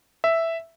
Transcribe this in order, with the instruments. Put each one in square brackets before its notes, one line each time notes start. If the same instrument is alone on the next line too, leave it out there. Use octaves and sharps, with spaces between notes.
[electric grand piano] E5